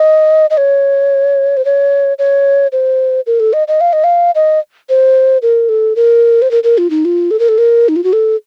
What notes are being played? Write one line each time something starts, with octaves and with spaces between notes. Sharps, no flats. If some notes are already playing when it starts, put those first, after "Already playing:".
Already playing: D#5
D#5
C#5
C5
C#5
C#5
C5
A#4
A4
D#5
D#5
F5
D#5
F5
D#5
C5
A#4
A4
A#4
C5
A#4
A#4
F4
D#4
F4
A4
A#4
A4
A#4
D#4
F4
F#4
A4